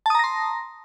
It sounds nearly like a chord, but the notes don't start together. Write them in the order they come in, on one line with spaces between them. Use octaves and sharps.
A5 D#6 A#5 A#6 C6